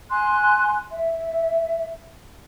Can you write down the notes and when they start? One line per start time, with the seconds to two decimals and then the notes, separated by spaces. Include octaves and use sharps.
0.09 G#5 C6 F#6
0.90 E5